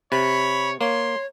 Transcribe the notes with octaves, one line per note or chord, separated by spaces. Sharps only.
C3 C#5 B5
A#3 C#5 C6